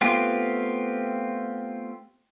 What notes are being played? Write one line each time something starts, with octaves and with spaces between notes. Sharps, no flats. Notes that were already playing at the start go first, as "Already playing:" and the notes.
A3 B3 C4 F4 G4